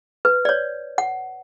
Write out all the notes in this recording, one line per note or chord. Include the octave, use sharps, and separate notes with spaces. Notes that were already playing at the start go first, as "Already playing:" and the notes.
B4
D5
C#5
F#5